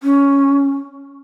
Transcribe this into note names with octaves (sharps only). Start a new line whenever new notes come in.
C#4